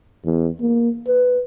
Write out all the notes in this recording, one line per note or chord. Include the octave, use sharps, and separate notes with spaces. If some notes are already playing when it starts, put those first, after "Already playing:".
E2
A#3
B4